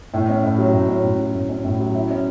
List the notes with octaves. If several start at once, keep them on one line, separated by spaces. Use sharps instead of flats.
A2
C#4
A2
F#3
A2
C#4
A2
F#3
A2
C#4
A2
F#3
E4
C#4